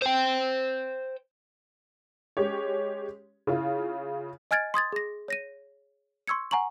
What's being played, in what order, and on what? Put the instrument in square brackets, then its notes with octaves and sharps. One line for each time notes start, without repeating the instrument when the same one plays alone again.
[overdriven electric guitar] C5 G5
[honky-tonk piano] G#3 C#4 G4 C#5
C#3 E4 F4
[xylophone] D#5 G#5 F6 G#6 A6 D7
C6 D#6 G#6 A6
G#4 A#6
C#5 A#6 D#7
C6 C#6 E6 G#6 C#7
F#5 G#5 A#5 C#6 F#7